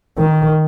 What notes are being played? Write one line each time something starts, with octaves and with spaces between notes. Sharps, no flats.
D#3